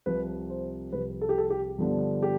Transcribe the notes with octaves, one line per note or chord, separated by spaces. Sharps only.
C2 C3 F3 B4
C5
C2 C3 F3 B4
A4
G4
A4
G4
G2 D3 F3 B3 D4
G4